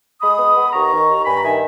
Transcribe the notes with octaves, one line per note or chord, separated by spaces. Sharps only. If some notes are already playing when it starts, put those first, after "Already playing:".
G#3 B5 D#6
B3
B3
B5
D#2 A#5 C#6
D#3
D#2
G2 G#5 B5
A#5
D#3 E5 G#5